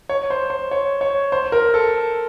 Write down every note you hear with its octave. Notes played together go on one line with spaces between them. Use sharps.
C#5
C5
C5
C#5
C#5
C5
A#4
A4